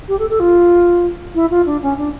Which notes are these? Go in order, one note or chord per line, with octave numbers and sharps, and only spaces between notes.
G4
A4
A4
F4
E4
F4
D4
C#4
D4